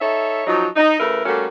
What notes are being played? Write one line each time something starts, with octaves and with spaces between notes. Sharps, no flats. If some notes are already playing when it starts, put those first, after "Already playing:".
D#4 A4 C#5 E5
F3 F#3 D#4
D#4
C#3 A3 E4 A#4 B4
G3 A3 A#3 C#4 F#4 A4